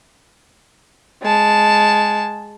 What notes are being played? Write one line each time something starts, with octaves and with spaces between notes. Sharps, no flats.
G#3 A5